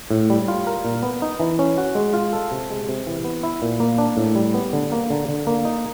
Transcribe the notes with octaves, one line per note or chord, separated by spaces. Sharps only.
A2
G3
F4
A#4
A#2
B3
D#4
E3
C#4
F#4
G#3
F4
A4
C3
G#3
C3
E3
B3
E4
A#2
A#3
D4
A2
G3
B3
D3
A#3
D3
D3
A#3
D#4